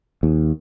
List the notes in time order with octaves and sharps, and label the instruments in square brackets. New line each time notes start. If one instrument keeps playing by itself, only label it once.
[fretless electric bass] D#2